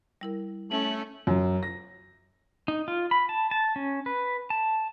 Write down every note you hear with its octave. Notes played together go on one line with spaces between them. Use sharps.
G3 E4 A#4
A3 C#4 F#7
F#2
A#6
D#4
F4
B5
A5
A5
C#4
B4
A5